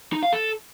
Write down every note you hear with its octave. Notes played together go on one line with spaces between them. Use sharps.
D#4
F5
A4